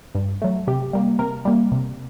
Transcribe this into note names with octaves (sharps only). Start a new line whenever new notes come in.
G2
F#3 A3
C3 G4
G3 A#3
C3 A#4
G3 A#3
C3